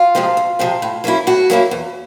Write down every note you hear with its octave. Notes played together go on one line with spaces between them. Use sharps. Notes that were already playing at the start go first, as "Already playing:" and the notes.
Already playing: F4
C3 F3 G#3 C4
D2
C3 F3 G#3 C4
A2
F#3 A#3 C#4 E4
A2 F#4
F#3 A#3 C#4 E4
E2